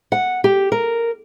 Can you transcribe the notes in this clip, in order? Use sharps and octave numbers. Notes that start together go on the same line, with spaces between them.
F#5
G4
A#4